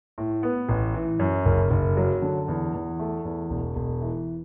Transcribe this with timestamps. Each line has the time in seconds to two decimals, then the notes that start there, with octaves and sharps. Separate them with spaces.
0.18 A2
0.43 B3
0.69 A1
0.94 E3
1.19 F#2
1.45 F#1
1.71 F#1
1.97 F#3
2.22 D3
2.48 E2
2.74 E2
2.99 A3
3.25 E2
3.50 E1
3.76 E1
4.01 E3